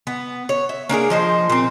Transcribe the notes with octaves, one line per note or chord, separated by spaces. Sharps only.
B3
C#5
E5
A#3 D4 G#4 A#4
F3 D#4 C5
A#2 C4